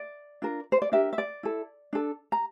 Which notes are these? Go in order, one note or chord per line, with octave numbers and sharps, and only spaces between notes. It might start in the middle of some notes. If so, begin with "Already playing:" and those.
Already playing: D5
D4 F4 A#4
C5
D5
D4 G4 A#4 E5
E5
D5
E4 A4
D4 A4
A#5